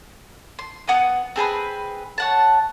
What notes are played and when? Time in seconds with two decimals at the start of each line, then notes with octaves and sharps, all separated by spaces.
0.59 C6
0.88 B3 F#5 G#5 D#6
1.36 C4 G#4 A4 B4
2.18 C#5 F#5 A5